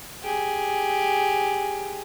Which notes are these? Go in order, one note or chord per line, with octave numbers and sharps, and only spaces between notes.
G4 G#4